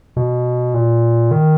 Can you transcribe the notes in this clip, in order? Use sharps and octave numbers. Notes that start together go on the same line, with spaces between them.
B2
A#2
D#3